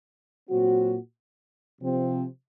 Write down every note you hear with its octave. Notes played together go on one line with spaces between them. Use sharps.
A#2 F#3 C4 F#4
C3 F3 C4